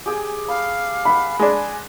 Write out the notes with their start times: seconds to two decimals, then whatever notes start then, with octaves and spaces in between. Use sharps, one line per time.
0.06 G4 G#4 G5 G#5
0.48 F5 B5
1.05 F#5 B5
1.39 G#3 D4 G#5